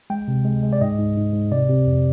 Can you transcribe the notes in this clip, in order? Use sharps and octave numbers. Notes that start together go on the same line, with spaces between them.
G#3 G5
C3
G#3
G#3
D5
G#2 D#5
G#2
G#2
G#2
C3 D5
C3
F2